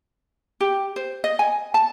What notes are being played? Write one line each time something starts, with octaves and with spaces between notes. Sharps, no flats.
G4
C5
D#5
G#5
A5